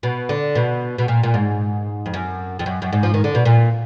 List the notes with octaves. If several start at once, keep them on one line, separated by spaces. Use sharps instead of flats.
B2
D3
B2
B2
A#2
A#2
G#2
F2
F#2
F2
F#2
F#2
G#2
F3
D#3
D3
B2
A#2